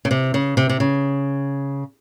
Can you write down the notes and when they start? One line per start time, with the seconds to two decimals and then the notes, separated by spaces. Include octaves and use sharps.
0.05 C#3
0.11 C3
0.34 C#3
0.57 C3
0.69 C3
0.80 C#3